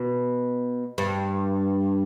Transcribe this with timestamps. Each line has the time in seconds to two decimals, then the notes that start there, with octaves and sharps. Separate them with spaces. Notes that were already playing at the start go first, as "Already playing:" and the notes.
Already playing: B2
0.98 G2